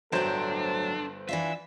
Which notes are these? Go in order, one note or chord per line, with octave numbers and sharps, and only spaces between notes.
G1 A2 F#3 D4 A4 C5 G6
E3 D4 F4 E5